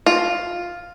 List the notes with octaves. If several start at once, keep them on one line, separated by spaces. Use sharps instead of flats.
F4